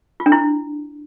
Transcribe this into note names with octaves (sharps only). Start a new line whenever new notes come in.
F4
D4
E4